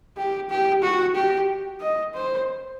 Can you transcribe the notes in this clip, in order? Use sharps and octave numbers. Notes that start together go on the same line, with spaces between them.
G4
G4
F#4
G4
D#5
C5